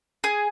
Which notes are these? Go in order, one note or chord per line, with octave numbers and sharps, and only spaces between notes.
G#4